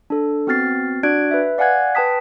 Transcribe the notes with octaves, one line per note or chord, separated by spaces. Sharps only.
D4 A4
B3 C4 F#4 F6 A6 C7
D4 F#4 D5 F#6 G#6 D7
B4 E5
D5 F5 F#5 G#5 F#6 G#6
B4 G5 A5 D#6 B6